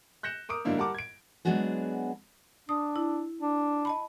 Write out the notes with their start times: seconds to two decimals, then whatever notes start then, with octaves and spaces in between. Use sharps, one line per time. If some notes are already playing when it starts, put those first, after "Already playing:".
0.23 F#6 G6 A#6 C#7 E7
0.49 A#4 D6 D#6 D7
0.65 G#2 D3 F#3 A#3 D4 E4
0.77 G3 A#4 F#5 A5 D6
0.95 G#6 D7
1.45 F#3 G#3 B3 D4 F#4 G#4
2.69 D4 D#6
2.96 E4
3.41 D4
3.85 D#5 A5 B5